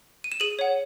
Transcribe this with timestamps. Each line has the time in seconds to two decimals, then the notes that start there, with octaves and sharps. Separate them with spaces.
0.24 D#7
0.32 E7
0.40 G#4 D#7 F#7
0.59 C#5 F#5